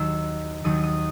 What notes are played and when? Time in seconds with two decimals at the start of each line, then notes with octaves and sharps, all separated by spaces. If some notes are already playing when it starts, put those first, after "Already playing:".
Already playing: D#2 D#3 F#3 E6
0.64 D#2 D#3 F#3 D#6
0.83 D#6